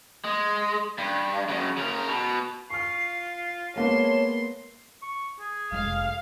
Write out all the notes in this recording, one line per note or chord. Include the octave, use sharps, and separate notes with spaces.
G#3
G2
F#2 C#3
C#3 A#4
B2
F4 C#6 F6 C7
G#3 A#3 B3 C#5 A5 C6
C#6
G#4
F1 G#3 F5